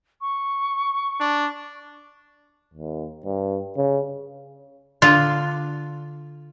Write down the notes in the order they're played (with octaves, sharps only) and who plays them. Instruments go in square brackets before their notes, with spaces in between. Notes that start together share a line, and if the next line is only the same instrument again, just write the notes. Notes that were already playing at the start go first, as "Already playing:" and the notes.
[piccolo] C#6
[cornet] D4
[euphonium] D#2
G2
C#3
[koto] D3 F4